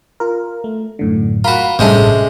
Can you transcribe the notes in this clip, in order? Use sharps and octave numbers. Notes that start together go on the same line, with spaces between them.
F4 A#4
A3
F#2 A2 D3
F4 F#4 A#4 B5
A1 G2 C3 G#3 C#4 A4